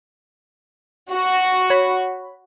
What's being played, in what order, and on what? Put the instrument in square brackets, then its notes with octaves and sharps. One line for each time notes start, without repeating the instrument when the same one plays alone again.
[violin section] F#4
[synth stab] C#5 B5